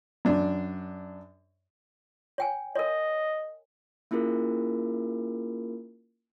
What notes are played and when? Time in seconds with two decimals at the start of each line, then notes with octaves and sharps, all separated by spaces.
0.25 F#2 D4
2.38 C#5 G5 G#5
2.75 A#4 C#5 D#5
4.11 A#3 C#4 E4 F4 G#4 A#4